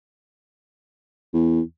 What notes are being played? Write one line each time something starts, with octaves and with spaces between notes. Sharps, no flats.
E2